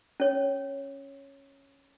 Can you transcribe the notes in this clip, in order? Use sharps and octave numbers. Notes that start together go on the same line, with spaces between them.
C#4 C#5